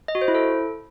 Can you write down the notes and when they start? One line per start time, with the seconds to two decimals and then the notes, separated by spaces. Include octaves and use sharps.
0.08 D#5
0.15 F#4
0.21 C5
0.28 E4
0.35 A4